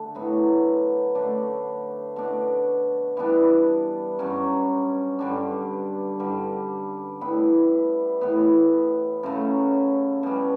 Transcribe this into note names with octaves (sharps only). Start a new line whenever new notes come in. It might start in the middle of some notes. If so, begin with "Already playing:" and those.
Already playing: D3 A3 D4
A2 F#3 B3
D3 A3 D4
B2 A3 D4
E3 G3 B3 D4
G2 F#3 C#4
G2 D3 G3 D4
G2 D3 G3
A2 G3 B3 E4
A2 E3 B3
F#2 C#3 F#3 A3
B2 G3 C#4